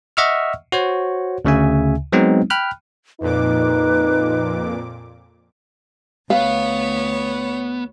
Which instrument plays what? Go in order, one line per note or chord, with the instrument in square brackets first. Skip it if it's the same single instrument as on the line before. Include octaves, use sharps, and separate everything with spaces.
[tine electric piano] D#5 E5 F#5 C#6 E6 F6
F#4 C5 C#5
D2 C#3 E5 G#5
F#3 G#3 B3 C4 D#4
G5 B5 F6 F#6
[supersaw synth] F2 A#2 D6 [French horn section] D#4 [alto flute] B4
[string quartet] D2 C#5 [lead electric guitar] B3 [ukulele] F5